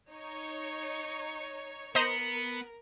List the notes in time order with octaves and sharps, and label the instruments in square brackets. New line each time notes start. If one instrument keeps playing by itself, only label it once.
[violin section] D#4 C#5 C#6
[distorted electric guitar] B3 [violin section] A#4 [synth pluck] C5 D#5 A#5